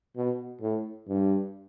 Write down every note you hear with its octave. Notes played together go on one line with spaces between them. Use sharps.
B2
A2
G2